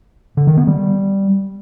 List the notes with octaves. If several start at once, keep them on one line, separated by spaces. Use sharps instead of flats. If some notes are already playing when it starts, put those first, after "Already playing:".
D3
D#3
B3
G3